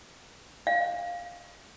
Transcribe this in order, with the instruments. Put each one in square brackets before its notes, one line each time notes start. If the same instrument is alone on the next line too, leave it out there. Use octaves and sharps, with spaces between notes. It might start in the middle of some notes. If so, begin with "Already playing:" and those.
[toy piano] F5